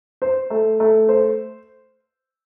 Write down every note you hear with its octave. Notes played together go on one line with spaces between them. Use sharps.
C5
A3
A3
C5